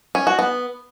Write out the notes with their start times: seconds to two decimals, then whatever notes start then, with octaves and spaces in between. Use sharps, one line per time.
0.15 C#4
0.27 F#4
0.39 B3